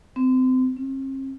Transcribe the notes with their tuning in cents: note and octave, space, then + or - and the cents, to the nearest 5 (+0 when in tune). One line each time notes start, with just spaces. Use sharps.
C4 -30
C4 +45